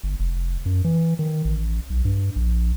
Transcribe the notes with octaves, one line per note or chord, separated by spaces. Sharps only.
G1
F1
F#2
E3
D#3
A1
B1
G2
A#1